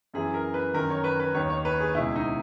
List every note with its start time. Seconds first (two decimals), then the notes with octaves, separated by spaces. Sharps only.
0.14 F#2 E3 G#4
0.34 A#4
0.54 B4
0.74 F#2 D#3 A#4
0.90 C#5
1.04 B4
1.20 B4
1.34 D#2 D#3 C#5
1.50 C#5
1.65 B4
1.80 G#4
1.95 C#2 B2 E4
2.16 D#4